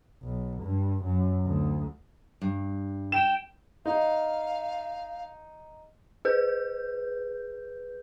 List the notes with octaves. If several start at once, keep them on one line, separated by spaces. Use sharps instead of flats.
B1
G2
F#2
D2
G2
G5 E7
D#4 F5
G#4 B4 G6